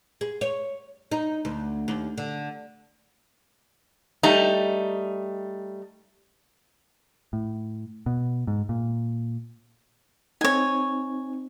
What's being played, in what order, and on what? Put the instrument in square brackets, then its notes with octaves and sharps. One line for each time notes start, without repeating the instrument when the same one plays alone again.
[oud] G#4
C#5
D#4
D2
D#2
D3
[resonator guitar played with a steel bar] G3 A3 D#4
[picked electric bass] A2
B2
G#2
A#2
[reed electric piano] C4 D#4 [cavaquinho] C#5 G#5